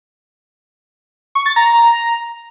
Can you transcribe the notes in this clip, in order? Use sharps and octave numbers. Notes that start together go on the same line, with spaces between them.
C#6
A6
A#5